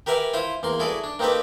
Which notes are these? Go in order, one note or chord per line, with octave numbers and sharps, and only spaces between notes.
G4 A#4 B4 E5 F#5 G#5
E4 F4 C5
E2 A#3 C6
E4 F#4 G#4 A4 D5
D4
A#3 C4 D#4 G4 A4 B4